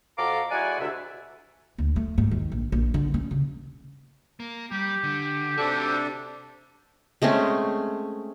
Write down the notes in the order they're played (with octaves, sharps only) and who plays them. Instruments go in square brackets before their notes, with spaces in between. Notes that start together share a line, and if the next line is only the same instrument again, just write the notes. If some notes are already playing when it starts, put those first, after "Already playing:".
[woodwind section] F2 F#4 A4 F5 A#5 D6
G#3 E4 F#4 D5 F#5 G#5
D2 C3 E5
[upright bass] D2
A3
G#2
D#2
A#1
A#1
D3
C#4
C#3
[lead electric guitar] A#3
[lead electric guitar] G3 [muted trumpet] G4
[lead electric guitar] D3
[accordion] C3 D4 A4 [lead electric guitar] F#4 C5
[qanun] G#3 A3 C4 C#4